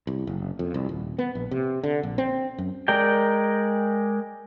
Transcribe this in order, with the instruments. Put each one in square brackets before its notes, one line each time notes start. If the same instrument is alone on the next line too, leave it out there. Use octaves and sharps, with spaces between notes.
[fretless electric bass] C2
F#1
F2
C2
D#1
B3
A#1
C3
D3
A#1
C4
F#2
[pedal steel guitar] G#3 A#4 D5 G5